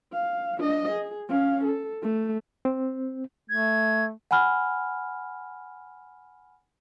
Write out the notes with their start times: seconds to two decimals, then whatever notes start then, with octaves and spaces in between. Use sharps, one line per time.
0.13 F5
0.58 D4 D#5
0.91 G#4
1.28 C#4 F5
1.64 A4
2.02 A3
2.65 C4
3.50 A3 G#6
4.31 F#5 G#5 B5 F6